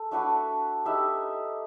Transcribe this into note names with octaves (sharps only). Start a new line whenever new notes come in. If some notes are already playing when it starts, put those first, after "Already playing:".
Already playing: A4
A3 D4 F#4 B4
D#4 G4 B4 E5